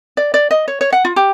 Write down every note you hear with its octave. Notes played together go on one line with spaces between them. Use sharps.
D5
D5
D#5
C#5
C#5
F#5
F4
G4